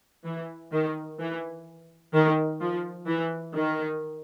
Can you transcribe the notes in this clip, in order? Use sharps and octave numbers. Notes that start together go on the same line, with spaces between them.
E3
D#3
E3
D#3
F3
E3
D#3